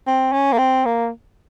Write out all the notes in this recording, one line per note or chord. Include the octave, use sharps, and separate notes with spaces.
C4
C#4
A#3
C4
A#3